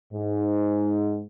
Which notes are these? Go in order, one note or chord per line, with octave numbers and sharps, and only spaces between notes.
G#2